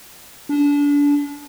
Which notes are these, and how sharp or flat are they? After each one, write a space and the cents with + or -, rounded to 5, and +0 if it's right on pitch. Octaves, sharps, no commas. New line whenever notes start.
D4 -30